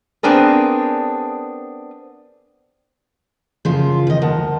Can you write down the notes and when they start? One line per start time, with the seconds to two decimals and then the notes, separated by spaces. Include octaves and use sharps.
0.23 B3 C4 D4 G#4 A#4
3.65 F#2 C#3 F3 F4
4.07 D#3 D#5
4.22 D2 A#4 F#5 A5